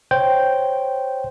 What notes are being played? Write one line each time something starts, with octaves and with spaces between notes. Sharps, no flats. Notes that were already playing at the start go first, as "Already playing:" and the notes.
C5 C#5 G5 G6